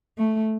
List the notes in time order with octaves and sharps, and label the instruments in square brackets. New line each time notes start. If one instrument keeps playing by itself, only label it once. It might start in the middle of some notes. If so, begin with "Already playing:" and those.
[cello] A3